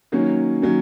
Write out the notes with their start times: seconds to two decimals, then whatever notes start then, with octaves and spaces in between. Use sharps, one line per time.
0.12 D#3 F#3 A#3 C#4
0.62 D#3 F#3 A#3 C#4